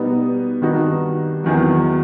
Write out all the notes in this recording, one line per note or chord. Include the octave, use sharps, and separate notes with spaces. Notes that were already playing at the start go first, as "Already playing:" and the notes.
Already playing: B2 G3 B3 D#4
G2 D#3 G3 D#4 F#4
E2 D#3 F#3